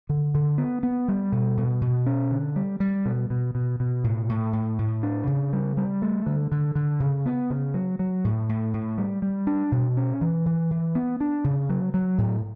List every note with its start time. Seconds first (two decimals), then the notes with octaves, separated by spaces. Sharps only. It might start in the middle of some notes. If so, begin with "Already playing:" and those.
0.09 D3
0.34 D3
0.58 B3
0.83 B3
1.08 G3
1.32 B2
1.58 B2
1.81 B2
2.06 C#4
2.31 D3
2.56 G3
2.80 G3
3.06 B2
3.30 B2
3.55 B2
3.80 B2
4.04 A2
4.29 A2
4.53 A2
4.79 A2
5.03 D4
5.27 C#3
5.53 G3
5.77 G3
6.02 A3
6.26 D3
6.52 D3
6.75 D3
7.00 C#3
7.26 B3
7.50 C#3
7.74 F#3
7.99 F#3
8.24 A2
8.49 A2
8.74 A2
8.98 G3
9.22 G3
9.47 D4
9.72 B2
9.97 C#4
10.21 E3
10.46 E3
10.71 E3
10.95 B3
11.21 D4
11.44 C#3
11.69 F#3
11.94 F#3
12.18 A2